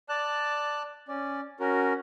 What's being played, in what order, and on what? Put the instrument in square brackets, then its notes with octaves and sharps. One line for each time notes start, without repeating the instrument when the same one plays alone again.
[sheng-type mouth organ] D5 A5 F#6
C#4 D5
C#4 F#4 A#4